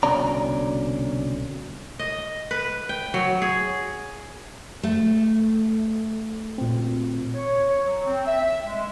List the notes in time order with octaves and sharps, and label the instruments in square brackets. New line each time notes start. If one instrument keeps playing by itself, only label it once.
[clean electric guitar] C2 B2 D3 C#4 D5 A#5
[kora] D#5
B4
G5
F#3
G#4
[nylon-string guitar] A3
[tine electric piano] A#2 C4
[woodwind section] C#5
C#5
F#3
C4
E5
G#3